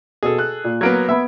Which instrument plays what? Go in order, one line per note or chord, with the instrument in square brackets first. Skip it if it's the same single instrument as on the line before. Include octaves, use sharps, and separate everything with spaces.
[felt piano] B2 [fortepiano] G#4 A4
[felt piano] F#6
A#2
[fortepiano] F#3 A#3 B3 [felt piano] G#6 D7
[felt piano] B3 B5 [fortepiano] E5